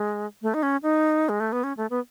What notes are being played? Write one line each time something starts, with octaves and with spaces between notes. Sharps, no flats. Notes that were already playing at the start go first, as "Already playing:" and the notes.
Already playing: G#3
A3
D#4
C#4
D#4
G#3
A3
B3
C#4
A3
B3